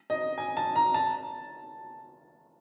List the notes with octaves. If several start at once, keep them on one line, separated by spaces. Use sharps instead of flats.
D#5
G#5
A5
A#5
A5